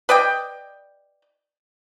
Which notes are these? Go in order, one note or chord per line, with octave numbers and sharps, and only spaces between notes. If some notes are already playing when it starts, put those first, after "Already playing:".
B4 D5 D#5 G5